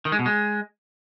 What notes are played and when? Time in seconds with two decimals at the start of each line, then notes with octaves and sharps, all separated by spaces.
0.05 D#3
0.12 G#3
0.19 B2
0.26 G#3